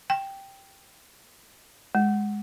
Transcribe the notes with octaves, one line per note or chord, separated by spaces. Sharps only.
G5
G#3